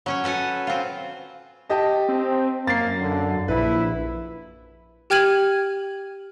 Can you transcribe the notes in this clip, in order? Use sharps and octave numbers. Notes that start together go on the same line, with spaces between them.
F#3 C#4 C#5
A4 B4 F#5 G#5
C4 F4
G4 D#5 A5
C4
F#2 A#3 A6 C7
D3
A#1 E4 B4
G4 G5 F6 G#6 D#7 F#7